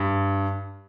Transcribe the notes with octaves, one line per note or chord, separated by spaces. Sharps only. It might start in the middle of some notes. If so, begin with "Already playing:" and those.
Already playing: G2